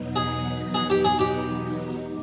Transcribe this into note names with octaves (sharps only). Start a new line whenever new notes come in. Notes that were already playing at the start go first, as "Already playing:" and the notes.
Already playing: E2 B2 F#3 B3 D#4
G#4
G#4
G4
G#4
G4
G#3